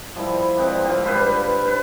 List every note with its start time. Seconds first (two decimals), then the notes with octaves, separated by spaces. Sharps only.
0.16 F3 G3 E4
0.57 G#2 C4 D4
0.84 D3 C4 F4
1.05 G2 B4 C5 B5
1.65 B4 C5